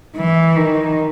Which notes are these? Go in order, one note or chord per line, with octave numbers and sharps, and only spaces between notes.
E3
D#3